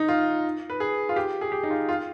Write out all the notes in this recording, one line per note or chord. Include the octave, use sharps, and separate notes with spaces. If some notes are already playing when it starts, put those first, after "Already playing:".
Already playing: D#4
F4
B4
G#4
F4
G4
G#4
G4
D#4
F4
F4